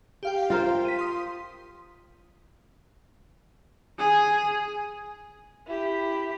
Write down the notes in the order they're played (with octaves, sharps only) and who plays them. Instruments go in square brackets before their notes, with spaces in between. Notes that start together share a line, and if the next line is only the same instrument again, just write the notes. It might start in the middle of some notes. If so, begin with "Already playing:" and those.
[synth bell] G4 F5 G5
[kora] F4 A#4 C5
[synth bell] B6 D#7
C6 D#6
[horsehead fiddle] G#4
[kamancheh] E4 G4